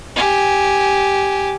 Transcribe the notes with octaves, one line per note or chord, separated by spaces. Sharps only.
G4 G#5